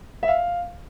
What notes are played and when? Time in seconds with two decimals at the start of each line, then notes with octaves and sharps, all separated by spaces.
0.23 E5
0.28 F5